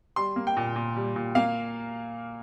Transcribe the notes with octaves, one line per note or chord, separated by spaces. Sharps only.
G3 C6
A#3
G5
A#2
A#2
G3
A#2
A#3 F5